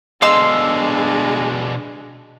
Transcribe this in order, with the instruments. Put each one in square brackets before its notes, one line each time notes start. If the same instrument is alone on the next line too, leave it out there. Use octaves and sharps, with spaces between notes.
[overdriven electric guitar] B2 D3 [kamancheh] G#3 D4 [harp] D#5 [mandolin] F5 C6 E6